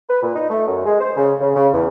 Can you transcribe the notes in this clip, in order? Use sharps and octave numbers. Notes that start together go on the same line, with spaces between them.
B4
A#2
D#4
A3
F#2
G#3
C5
C#3
C#3
C#3
E2